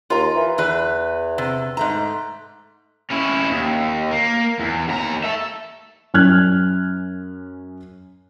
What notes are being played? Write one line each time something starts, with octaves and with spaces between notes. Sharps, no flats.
D#2 F4 A#5
E3
E2 E3 B4
C3
G#2 A3 A#5
C#4 E4
D#2
A#3
E2
D#2 A#5
E5 A5
F#2 C#4 F6 F#6 G#6